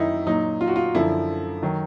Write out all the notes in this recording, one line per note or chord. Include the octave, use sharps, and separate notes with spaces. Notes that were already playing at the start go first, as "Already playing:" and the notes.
Already playing: F#2 D#3 F#3 D#4 E4
A#2 F#3 D#4
F4
F#4
F4
F#2 D3 F3 E4
D#3 F#3